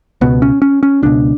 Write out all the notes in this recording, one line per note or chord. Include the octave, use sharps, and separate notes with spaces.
C#2 B2 B3
C#4
C#4
C#4
C#2 B2 D4